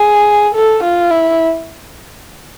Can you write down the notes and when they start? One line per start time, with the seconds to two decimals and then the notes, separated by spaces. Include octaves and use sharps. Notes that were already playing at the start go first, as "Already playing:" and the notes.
Already playing: G#4
0.54 A4
0.83 F4
1.11 E4